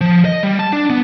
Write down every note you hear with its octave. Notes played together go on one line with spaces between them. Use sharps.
F3
D#5
G3
A5
D4
B3